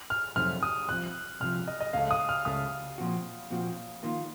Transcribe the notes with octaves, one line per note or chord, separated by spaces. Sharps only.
F6
F2 C3 F#3 A3 D#4 F6
D#6
C2 C3 F3 F#6
C2 C3 F3 F6
D#5
D#5
C#2 C#3 A3 C#4 A4 F5
D#6
F6
C#2 C#3 A3 C#4 A4 D#6
A#2 F3 C4 F#4
A#2 F3 C4 F#4
D#3 A#3 F4